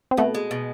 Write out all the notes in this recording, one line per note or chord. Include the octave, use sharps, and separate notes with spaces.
C4
B2 A3 B3
G#3
B2